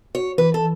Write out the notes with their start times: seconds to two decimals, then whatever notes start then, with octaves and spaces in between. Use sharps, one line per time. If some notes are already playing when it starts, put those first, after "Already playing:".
0.15 F#4 C#5
0.38 E3 B4
0.54 A4